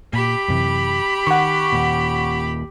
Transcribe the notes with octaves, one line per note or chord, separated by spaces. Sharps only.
A#2 G4 B5
F#2 C3 E3
D#3 F#5 C#6
D#2 A#2